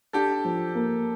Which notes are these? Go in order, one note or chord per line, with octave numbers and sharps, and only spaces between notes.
D4 G4 A4
F3
A#3